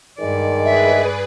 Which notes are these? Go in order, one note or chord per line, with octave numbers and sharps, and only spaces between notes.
G2 D#3 G#3 D5
G#4 B4 E5